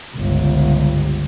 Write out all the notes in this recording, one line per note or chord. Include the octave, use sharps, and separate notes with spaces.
G1 C#2